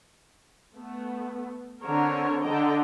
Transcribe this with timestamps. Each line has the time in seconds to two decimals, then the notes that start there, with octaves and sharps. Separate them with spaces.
0.74 A3 B3
1.83 D3 C4 A#4 C#5
2.43 D3 A4 D#5 G5 A#5